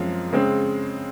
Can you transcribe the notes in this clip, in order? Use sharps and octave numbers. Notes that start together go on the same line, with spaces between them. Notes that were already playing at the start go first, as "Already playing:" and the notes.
Already playing: F#2 F3 G#3 C4
C#3 G#3 C4